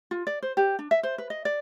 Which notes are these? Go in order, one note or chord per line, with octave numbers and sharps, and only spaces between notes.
F4
D5
C5
G4
D4
E5
C5
B4
D#5
D5